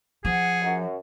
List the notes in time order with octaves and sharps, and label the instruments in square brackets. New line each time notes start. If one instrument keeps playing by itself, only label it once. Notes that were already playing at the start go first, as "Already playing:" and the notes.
[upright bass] F3 [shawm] G#4 [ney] F#5
[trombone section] F#2